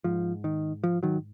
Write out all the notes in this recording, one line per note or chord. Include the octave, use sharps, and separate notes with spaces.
G#2 F3
D#3
F3
D#3 F#3